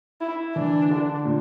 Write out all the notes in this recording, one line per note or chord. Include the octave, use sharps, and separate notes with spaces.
E4
E3 D4
D3
A#2